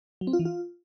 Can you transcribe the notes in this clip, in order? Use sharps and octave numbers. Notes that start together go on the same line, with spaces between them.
F#3
C4
F4
E3
F4